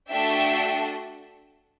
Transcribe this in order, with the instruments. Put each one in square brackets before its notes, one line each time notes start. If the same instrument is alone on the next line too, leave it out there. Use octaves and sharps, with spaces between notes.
[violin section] A3 D4 F#4 A4 E5 G5